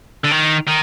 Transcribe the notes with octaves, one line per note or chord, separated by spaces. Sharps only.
D3
D#3
D#3